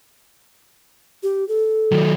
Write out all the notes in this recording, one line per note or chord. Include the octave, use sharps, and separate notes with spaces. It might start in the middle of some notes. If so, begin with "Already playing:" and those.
G4
A4
D#3 F#3